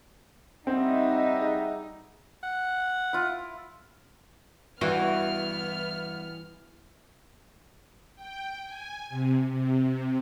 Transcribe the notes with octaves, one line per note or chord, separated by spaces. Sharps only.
G3 C4 D#4 E5 F#5
G#4
F#5
E4 F4
G2 E3 B3 F#4 F6
G5
G#5
C3
C3